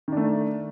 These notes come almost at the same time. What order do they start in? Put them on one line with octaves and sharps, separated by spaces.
D#3 D4 A3